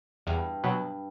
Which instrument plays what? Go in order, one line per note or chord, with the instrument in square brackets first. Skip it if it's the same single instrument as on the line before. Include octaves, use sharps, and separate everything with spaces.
[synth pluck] E2 [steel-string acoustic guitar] G2
[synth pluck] B2 F#3